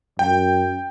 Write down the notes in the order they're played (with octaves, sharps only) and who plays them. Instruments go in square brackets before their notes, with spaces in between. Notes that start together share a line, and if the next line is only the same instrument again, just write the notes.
[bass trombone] F#2 [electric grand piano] G5